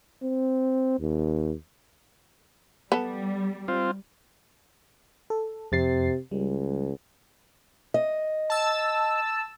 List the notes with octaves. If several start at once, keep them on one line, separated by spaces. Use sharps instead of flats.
C4
D#2
G3 B3 A4
C4 F4
A4
F2 C3 A6 C7
C#2 G3
D#5
A5 E6